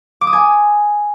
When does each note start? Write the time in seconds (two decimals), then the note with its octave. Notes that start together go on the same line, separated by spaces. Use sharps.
0.21 D6
0.27 D#6
0.33 G#5